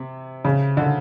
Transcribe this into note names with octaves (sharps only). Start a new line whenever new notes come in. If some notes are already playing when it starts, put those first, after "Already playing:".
Already playing: C3
C#3
D3